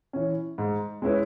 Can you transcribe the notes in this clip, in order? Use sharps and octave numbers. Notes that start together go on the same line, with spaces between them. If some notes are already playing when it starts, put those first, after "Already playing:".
E3 C#4
G#2
G#3 C#4 E4 B4